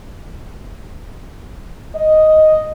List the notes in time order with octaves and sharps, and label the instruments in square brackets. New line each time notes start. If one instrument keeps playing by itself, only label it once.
[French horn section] D#5